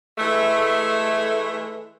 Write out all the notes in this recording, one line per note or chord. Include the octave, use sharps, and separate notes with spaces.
E3 G#3 A3